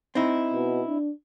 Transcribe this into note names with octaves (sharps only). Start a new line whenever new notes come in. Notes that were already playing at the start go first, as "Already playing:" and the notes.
C4 D#4 E4
B2
D4